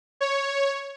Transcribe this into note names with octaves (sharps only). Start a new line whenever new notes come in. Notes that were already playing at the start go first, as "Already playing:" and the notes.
C#5